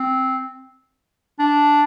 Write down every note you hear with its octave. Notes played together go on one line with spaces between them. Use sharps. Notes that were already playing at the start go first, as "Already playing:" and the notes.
Already playing: C4
D4